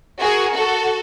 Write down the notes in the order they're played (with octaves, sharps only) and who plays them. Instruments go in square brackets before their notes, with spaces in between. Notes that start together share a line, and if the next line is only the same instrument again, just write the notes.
[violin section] F#4 G#4 A#4
F#4 A4